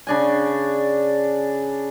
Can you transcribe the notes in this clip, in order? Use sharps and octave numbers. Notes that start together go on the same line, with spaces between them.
C#3 D4 G#5